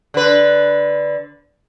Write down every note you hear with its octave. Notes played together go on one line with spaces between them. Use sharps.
D3 B4